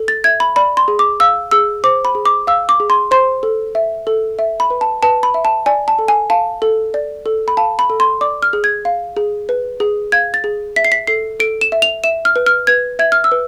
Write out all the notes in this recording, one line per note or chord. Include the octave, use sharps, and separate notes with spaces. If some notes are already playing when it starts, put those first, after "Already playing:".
Already playing: A4
A6
E5 G#6
B5
D5 B5
C6
G#4
D6
F5 E6
G#4 E6
C5 D6
B5
G#4
D6
F5 E6
D6
G#4
C6
C5 C6
A4
E5
A4
E5
B5
B4
A5
B4 A5
B5
E5
A5
D5 G#5
A5
A4
G#5
F5 A5
A4
D5
A4
B5
F5 A5
B5
A4
C6
D5 D6
F6
G#4
G#6
F5
G#4
B4
G#4
F5 G#6
A6
G#4
E5 B6
C7
B6
A4 C7
A4 D7
E7
E5
F7
E5 E7
F6
B4
F6
B4 G#6
E5 G#6
F6
E6
B4